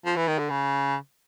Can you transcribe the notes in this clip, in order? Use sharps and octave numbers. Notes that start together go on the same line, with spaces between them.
F3
E3
D#3
D3
C#3